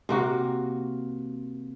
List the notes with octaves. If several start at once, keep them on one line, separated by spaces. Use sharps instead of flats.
C3 A#3 F#4